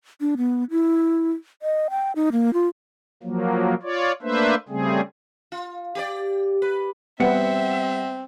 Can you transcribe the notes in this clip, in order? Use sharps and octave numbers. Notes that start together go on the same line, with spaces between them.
D4
B3
E4
D#5
G5
D#4
A#3
F4
F3 F#3 A#3
F4 C#5 D5
A3 A#3 D4 B4 C5 E5
C#3 G3 A3 C4 G#4
F4
G4 A#4 D5
B4
G3 B3 C4 E5 F#5 C#7